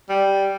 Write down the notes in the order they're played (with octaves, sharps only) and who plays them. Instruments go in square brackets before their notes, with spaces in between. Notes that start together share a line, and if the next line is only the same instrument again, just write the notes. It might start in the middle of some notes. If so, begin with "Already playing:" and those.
[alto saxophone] G3